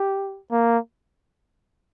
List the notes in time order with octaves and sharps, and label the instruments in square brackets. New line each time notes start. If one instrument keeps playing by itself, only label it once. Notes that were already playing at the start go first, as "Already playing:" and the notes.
Already playing: [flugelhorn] G4
A#3